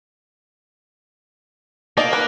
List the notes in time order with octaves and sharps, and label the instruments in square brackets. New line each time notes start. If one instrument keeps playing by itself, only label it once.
[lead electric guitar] A#3 [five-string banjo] D#4 D5
[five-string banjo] B4